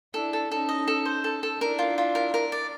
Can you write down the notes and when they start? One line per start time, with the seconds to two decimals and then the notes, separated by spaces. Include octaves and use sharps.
0.14 D4 E4 A4
0.33 A4
0.51 C#4 D#4 A4
0.69 D#5
0.88 A4
1.05 C5
1.24 A4
1.43 A4
1.61 D4 E4 A#4
1.79 F4
1.98 F4
2.15 A#4
2.34 A#4
2.52 D5